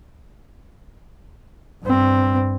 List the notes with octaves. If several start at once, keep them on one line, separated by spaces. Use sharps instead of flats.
G2 C4